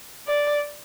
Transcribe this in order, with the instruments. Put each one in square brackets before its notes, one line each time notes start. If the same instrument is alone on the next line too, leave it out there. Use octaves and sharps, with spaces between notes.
[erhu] D5